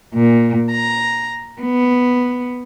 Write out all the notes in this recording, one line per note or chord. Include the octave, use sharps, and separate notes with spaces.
A#2
A#5
B3